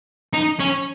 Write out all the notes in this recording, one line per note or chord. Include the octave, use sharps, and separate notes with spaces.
D#4
C#4